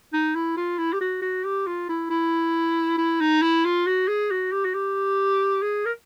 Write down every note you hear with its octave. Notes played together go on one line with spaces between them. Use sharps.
D#4
E4
F4
E4
G4
F#4
F#4
G4
F4
E4
E4
E4
D#4
E4
F4
F#4
G#4
F#4
G4
F#4
G4
G#4
A#4